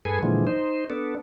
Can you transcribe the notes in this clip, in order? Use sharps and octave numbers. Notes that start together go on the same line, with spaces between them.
G2 G#4 A4 B4 G#5
A#2 D3 E3 F3 G#3
D#4 C5
B3 D4 A4